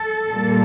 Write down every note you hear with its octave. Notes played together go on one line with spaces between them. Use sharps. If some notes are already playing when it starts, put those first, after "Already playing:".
Already playing: A4
A#2 G3 A#3